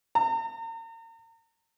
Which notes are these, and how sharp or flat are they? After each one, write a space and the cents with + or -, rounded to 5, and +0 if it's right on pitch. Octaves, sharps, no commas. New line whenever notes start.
A#5 -40